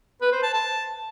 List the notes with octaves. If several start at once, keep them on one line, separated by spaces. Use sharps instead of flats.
B4
C5
A5
A5